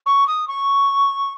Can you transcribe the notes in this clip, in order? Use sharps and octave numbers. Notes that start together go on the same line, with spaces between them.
C#6
D#6
C#6